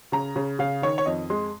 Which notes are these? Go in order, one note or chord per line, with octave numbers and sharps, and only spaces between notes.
C#3 A#5
C#3
C#3 F5
D#3 C#5
C#5
F2 D#5
G#3 C6